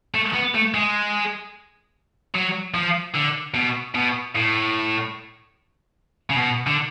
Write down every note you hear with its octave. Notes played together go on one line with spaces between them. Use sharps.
A3
B3
A3
G#3
F#3
F3
D3
B2
B2
A2
C#3
B2
D3